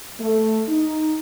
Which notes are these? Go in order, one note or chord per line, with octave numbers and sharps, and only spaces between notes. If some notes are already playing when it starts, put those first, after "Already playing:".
A3
D#4